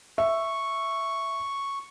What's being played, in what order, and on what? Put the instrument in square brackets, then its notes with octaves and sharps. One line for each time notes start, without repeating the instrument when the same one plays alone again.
[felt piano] E5 [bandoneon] C#6